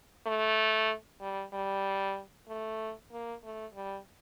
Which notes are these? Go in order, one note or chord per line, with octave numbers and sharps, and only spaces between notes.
A3
G3
G3
A3
A#3
A3
G3